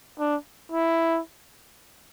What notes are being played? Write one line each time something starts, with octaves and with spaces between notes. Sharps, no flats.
D4
E4